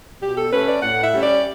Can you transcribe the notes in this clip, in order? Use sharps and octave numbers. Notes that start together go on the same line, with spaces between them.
B2 G4
A4
A3 C#4 B4
D5
A2 F#5
E5
G3 C#4
D5